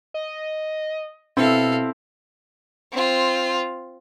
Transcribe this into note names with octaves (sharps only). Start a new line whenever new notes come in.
D#5
B2 C4 E4 A4 F5
C4 F4